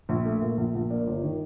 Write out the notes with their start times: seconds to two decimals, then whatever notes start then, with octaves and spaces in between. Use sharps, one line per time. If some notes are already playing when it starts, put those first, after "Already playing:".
0.09 A#1
0.25 A3
0.41 A#2
0.58 A#1
0.75 A#1
0.91 A#3 D5
1.07 G1
1.23 D#3